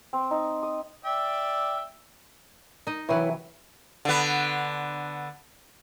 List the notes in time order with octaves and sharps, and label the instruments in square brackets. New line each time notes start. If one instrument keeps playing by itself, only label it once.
[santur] C4
D#4
D#6
[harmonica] D5 E5 G5
[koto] D#4 D#5
[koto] C3 E3 F#3 [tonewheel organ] E4 B4 C#5 [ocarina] E5
[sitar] D3 B3